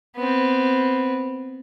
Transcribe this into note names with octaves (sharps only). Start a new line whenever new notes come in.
B3 C4